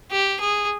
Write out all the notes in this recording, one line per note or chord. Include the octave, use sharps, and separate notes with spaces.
G4
G#4